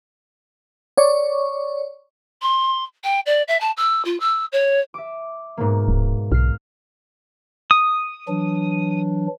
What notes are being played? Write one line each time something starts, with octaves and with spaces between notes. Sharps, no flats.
C#5 D5 C#6
C6
G5
D5
E5
A5
E6
F4
E6
C#5
E5 D6
G#2 B2 A#3
D1
B1 F6 C7
D#6
E3 F#3 D4